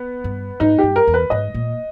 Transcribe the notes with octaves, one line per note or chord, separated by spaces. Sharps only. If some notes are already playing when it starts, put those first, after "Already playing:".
Already playing: B3
G2
G#2 D#4
G2 G4
A#4
E2
B4
G#2 D#5
A#2